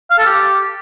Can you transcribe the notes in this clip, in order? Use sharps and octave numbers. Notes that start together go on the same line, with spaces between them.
F5
A4
G4